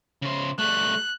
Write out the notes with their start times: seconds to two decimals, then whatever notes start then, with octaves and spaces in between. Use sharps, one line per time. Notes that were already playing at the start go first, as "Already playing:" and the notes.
0.22 C#3 C5
0.59 G3 A3 F#6